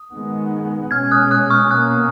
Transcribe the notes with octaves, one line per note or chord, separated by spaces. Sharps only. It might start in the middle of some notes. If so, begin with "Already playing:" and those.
Already playing: D#6
D#3 G#3 B3
B2 G#3 C#4 F6 G#6
D#6 F#6
D#6 F#6
C#6 F6
B2 A#3 C#4 D#6 F#6